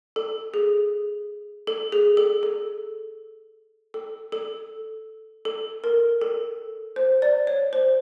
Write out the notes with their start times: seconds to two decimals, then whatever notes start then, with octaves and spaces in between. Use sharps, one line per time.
0.16 A4
0.54 G#4
1.67 A4
1.92 G#4
2.17 A4
2.43 A4
3.94 A4
4.32 A4
5.45 A4
5.84 A#4
6.22 A4
6.96 C5
7.22 D5
7.47 C#5
7.73 C5